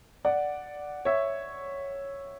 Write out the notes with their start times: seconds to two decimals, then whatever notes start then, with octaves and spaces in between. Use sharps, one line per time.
0.25 D5 F#5
1.05 C#5 E5